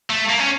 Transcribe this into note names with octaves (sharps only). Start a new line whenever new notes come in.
A3
A#3
C#4